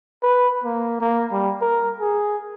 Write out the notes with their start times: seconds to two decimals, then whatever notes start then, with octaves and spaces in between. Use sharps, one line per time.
0.23 B4
0.64 A#3
1.01 A#3
1.32 G3
1.61 A#4
2.00 G#4